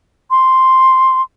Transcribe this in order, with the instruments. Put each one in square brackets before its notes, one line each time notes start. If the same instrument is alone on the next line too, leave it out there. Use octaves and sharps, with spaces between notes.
[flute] C6